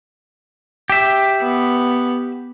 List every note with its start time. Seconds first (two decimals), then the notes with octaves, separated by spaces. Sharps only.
0.90 G4 E5
1.42 B3